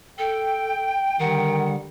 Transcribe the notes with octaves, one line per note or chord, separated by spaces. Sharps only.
A4 G5
D3 D#3 G3 F#5